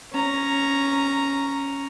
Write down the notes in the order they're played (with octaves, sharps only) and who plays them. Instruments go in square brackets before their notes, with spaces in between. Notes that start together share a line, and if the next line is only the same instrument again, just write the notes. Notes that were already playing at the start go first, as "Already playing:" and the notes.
[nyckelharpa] C#4 A#5